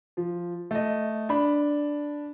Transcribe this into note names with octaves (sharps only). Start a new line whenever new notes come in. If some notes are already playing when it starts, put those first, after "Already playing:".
F3
A3 D#5
D4 B5